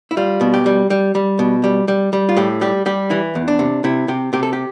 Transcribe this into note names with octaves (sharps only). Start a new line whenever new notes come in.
E4
G3 F4
B2
G4
G3
G3
G3
B2
G3
G3
G3
F4
A2 G4
G3 G4
G3 G4
E3 E4
E2
D4
C3
C3 E4
C3 G4
C3 G4
A4
G4